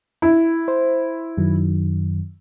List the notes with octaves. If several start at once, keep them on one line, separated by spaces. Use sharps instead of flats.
E4
C5
F#2 D#3 F#3